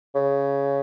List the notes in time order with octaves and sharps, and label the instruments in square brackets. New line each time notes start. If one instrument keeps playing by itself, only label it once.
[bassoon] C#3